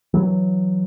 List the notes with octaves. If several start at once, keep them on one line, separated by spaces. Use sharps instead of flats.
E3 F#3